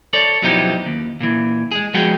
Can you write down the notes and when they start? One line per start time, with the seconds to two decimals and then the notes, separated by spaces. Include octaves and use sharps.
0.13 A4 C#5 D5
0.42 F#2 B2 E3 F3 D#4 G4
0.85 D#2
1.21 A#2 E3
1.71 G#3 G#4
1.94 F3 G#3 B3 F#4 G#4 G5